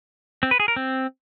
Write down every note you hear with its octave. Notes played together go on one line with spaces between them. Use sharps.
C4
B4
G#4
A#4
C4